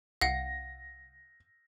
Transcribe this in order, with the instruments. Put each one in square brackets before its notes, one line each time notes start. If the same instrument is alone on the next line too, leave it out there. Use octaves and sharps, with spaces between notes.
[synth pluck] C2 [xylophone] F5 F#5 [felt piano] A#6